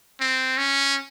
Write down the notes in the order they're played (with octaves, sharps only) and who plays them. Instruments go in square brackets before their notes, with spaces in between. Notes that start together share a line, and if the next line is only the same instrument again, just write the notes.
[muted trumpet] C4
C#4